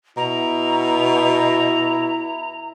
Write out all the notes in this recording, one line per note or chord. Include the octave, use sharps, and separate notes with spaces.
B2 E4 A#5